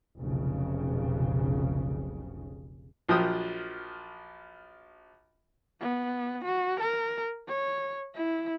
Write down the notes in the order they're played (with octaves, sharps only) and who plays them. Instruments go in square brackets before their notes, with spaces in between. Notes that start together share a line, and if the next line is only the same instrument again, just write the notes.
[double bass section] F1 B1 F2 C#3
[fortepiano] A#1 F3 F#3 G5 D#6
[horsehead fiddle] B3
F#4
A#4
C#5
E4